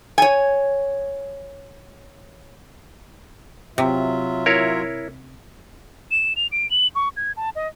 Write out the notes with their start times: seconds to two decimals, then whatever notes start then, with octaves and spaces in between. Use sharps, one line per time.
0.18 C#5 G#5
3.78 C3 F#3 F4 E5
4.46 E4 A#4 C#5
6.11 E7
6.36 F7
6.52 D7
6.71 F#7
6.95 C#6
7.17 G#6
7.37 A5
7.56 D#5